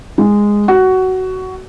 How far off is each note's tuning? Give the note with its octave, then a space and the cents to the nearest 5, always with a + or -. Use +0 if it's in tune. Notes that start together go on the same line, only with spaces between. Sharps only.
G#3 -10
F#4 +15